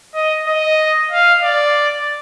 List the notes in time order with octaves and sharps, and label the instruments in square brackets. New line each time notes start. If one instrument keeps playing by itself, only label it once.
[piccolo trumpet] D#5
D#5
F5
D5